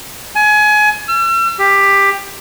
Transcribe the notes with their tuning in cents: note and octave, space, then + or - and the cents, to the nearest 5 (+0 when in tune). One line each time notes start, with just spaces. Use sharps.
G#5 +25
E6 +45
G4 +15